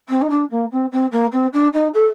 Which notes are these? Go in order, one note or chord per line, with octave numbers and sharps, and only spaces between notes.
C4
D#4
D4
A#3
C4
C4
A#3
C4
D4
D#4
A4